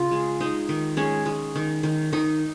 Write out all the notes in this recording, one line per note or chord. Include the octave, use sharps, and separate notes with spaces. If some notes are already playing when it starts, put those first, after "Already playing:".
Already playing: C#3 F4
G#3
G#3 D#4
D#3
G#3 C#4
G#3
D#3
D#3
D#3 D#4